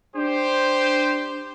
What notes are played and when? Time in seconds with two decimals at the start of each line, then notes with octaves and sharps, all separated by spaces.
0.16 D4 G4 C5